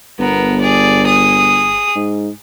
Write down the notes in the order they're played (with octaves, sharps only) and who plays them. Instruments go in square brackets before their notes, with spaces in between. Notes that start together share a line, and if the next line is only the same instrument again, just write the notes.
[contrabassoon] G1 [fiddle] B3 A#4
[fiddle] G#4 D5
G#4 D#6
[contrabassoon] G#2